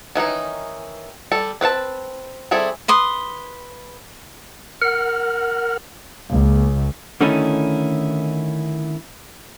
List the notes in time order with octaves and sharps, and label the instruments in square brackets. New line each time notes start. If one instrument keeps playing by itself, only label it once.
[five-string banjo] D#3 E3 C#4 D#4
G3 A4
C4 B4 F5 A5
G3 C4 E4 G#4 A4
[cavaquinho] B4 C6 D#6
[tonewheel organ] A#4 F#5 F6
[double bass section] C#2 [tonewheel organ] A#3
[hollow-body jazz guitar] D3 D#3 A3 C#4 D#4 E4